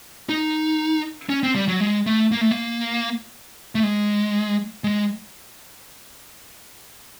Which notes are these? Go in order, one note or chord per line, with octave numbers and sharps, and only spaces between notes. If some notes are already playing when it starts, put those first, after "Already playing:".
D#4
C#4
C4
G3
F#3
G#3
A3
A#3
A3
A#3
A3
G#3
G#3